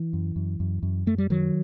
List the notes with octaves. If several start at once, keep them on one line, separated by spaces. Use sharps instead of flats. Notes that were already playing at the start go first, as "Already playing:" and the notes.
Already playing: E3
F#2
F#2
F#2
F#2
F#2 A3
G3
F#2 D#3 F#3